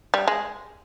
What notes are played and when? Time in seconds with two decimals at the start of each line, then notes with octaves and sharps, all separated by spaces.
0.14 G3
0.28 G#3